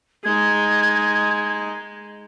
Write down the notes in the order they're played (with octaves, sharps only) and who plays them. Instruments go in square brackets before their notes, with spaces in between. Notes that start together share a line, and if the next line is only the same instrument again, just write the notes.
[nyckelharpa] G#3 D#4 [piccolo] G#6